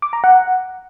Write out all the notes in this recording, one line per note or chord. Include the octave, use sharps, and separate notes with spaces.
D6
A#5
F#5